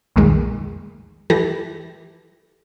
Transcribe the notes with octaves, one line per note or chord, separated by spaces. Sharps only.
B1 F2 A#2 D#3 G#3
E3 E4 G4 A4 A#6